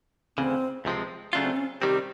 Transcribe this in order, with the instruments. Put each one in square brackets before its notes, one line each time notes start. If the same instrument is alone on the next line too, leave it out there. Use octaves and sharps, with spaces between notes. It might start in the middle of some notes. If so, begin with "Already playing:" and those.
[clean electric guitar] D2 C#3 E3 [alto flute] C4
[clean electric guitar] C#2 C3 F3 G#3 C4
[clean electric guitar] C#3 F#3 A3 D4 F4 [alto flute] C#4
[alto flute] C4
C#4
[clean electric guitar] C3 D#3 G3 C4 [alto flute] G4